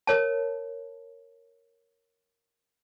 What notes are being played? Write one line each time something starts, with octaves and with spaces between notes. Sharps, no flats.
A#4 C#5 A5